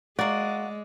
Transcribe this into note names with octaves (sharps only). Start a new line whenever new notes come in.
G#3 A#3 F#4 D5